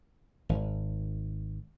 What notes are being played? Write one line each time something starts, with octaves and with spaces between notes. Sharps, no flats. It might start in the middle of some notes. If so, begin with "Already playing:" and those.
G#1